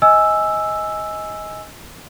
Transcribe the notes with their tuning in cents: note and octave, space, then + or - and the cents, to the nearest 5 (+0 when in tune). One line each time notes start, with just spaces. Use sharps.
D#5 +20 G#5 +0 E6 +0